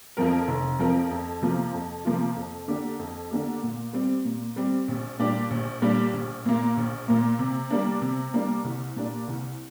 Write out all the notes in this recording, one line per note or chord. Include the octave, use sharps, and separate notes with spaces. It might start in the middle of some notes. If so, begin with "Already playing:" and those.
F2 F3 C4 A#4
F1
F2 F3 C4 A#4
F2
C3 F3 A#3 F4
F2
C3 F3 A#3 F4
F2
D3 A#3 D4 G4
F2
D3 A#3 D4 G4
A#2
G3 C4
A#2
G3 C4
A#1
A#2 G3 D4 G4
A#1
A#2 G3 D4 G4
A#1
A#2 A#3
A#1
A#2 A#3
C3
G3 A#3 D4
C3
G3 A#3 D4
C2
A#2 A#3 D4 G4
C2